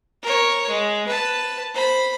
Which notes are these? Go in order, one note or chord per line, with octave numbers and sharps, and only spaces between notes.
A#4 C#5
G#3
B4 A5
C5 B5